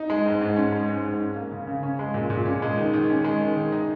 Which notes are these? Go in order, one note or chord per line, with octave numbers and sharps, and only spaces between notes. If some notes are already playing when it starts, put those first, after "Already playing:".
Already playing: D#4
G#3
G#2
G#2
C#4
G#3
G#2
G#2
C#4
A#3
C#3
C#3
C#4
G#3
A#2
A#2
C#4
G#3
D#3
D#3
C#4
G#3
D#3
D#3
D#4